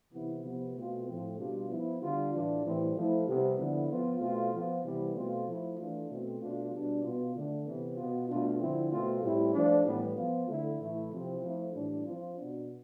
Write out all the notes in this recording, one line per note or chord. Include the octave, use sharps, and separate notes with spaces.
C3 E3 B3 E4
C3 F3 B3
B2 A3 C4 F4
A2 F3 A3 C4
B2 G3 D4 F4
F3 B3 E4
D3 G3 B3 D4 F4
A2 E3 A3 D4 F4
A2 E3 G3 C4 E4
F3 A3 E4
C3 G3 B3
D3 F3 B3 E4
F3 B3 F4
B2 A3 C4 F4
F3 B3 F4
C3 E3 G3 B3 E4
B2 A3 C4 F4
F3 A3 E4
E3 A3 D4 F4
B2 A3 C4
B2 A3 D4 F4
B2 G3 D4
B2 B3 F4
D3 A3 D4
C3 E3 B3
B2 B3 F4
B2 A3 D4 F4
D3 F3 C4 E4
B2 A3 C4 F4
A2 G3 C4 E4
F3 A3 D4
A2 E3 G3 B3
F3 B3 F4
D3 A3 E4
A2 E3 A3 E4
C3 F3 C4 E4
F3 A3 E4
A2 E3 G3 D4
F3 C4 F4
B2 B3 D4